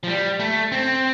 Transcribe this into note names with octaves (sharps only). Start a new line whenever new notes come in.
F3
G3
A3
C4